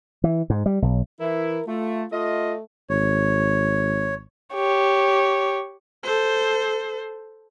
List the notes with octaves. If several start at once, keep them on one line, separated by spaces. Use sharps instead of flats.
E3
G#2
G3
B1
E3 E4 A#4
A3 F4
A3 F4 D#5
G#1 C#5
G4 C#5
A4 C5